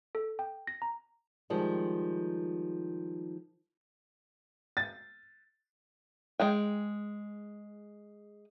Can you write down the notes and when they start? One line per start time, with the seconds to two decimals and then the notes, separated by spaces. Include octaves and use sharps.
0.15 A4
0.39 G5
0.67 A#6
0.82 A#5
1.50 D#3 F3 G3 G#3
4.77 A6
6.40 G#3 G#4 G5